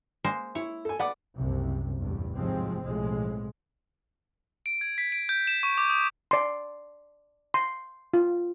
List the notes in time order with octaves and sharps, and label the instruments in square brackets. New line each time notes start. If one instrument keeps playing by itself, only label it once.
[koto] G#3 A#3 C5
[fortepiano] E4 [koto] C#5
[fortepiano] A4 G#5
[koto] B3 [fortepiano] D5 F#5 D6
[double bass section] F#1 C2 C3
A1 E2 G2
G#2 C3 F3 F#3 G#3 C4
B1 A2 C3 F3 G#3
[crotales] D7
G#6
B6
D7
G6
E7
C#6
D6
D#6
[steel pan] D5 C6
C6
F4